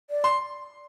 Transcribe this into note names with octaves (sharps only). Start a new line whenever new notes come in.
D5
C6